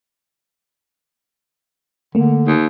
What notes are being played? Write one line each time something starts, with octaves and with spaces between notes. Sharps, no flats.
D3 A3 A#3
D#2